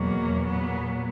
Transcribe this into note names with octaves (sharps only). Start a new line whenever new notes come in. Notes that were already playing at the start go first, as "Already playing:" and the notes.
Already playing: E2 B2 F#3 A#3
A#2 F#3 B3